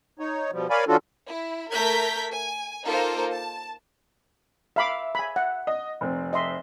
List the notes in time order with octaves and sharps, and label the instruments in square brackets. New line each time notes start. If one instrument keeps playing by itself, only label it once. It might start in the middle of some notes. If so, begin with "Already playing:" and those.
[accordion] D#4 C#5
B2 F3 G3
A#4 C#5 D5 F5 G#5 B5
E3 C#4 D4 F4 F#4 A4
[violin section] E4
A3 A#4 A#5 G6 G#6 B6
G#5
A#3 D#4 F4 A4 A#4 C5
A5
[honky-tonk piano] E5 [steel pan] F5 B5 D6
[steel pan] G#5 B5
F#5
[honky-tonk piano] D#5
F1 C4
[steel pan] D#5 E5 C6